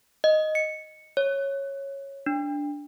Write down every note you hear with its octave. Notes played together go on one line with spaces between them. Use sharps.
D#5
C#7
C#5
D4